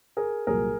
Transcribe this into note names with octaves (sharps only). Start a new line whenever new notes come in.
G#4 A#4
C2 A#2 F#3 G#4 A#4